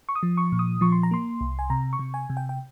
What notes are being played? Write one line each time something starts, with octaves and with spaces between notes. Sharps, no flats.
C#6
D#6
F3
C#6
A#2
D#6
F3 C#6
C6
A#5
A#3 C6
C2
G#5
C3 A#5
C#6
C3
G#5
C3
G5
G5